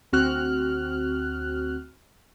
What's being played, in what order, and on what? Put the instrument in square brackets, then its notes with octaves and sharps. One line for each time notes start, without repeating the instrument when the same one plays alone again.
[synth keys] D2 C4 F#4 F6 F#6